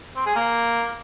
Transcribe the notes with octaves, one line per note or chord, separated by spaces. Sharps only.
C4
G#4
A#3